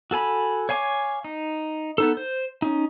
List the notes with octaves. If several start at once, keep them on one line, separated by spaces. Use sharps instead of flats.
F#4 A4 G#5 B5
C#5 F5 G#5 C#6 D6
D#4
B3 D#4 A4
C5
C#4 D#4